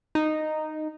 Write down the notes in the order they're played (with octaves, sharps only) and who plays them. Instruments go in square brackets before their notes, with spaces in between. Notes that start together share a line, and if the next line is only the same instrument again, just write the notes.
[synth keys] D#4